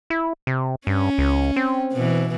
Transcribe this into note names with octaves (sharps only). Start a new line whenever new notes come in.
E4
C3
G2 C#4
C#2
C4
B2 E3